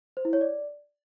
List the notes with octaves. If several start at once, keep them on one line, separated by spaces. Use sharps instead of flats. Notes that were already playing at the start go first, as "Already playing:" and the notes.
C5
E4
C#5
D5